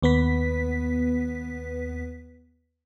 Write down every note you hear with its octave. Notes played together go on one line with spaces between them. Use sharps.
D#2 B3 B4 B6